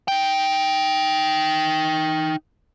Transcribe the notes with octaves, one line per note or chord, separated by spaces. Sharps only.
D#4 G5